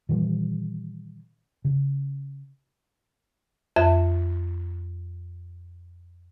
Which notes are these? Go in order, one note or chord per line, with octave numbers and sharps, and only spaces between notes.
A#2 D#3 E3 G3
C#3
F2 E5